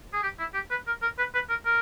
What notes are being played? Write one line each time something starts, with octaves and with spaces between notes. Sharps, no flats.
G#4
G4
E4
G4
B4
A#4
A#4
B4
B4
A#4
A#4